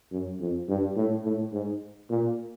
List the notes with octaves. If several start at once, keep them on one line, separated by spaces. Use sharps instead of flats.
F#2
F2
G2
A2
A2
G#2
A#2